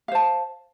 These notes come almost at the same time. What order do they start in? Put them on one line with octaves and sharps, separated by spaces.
F5 C5 A5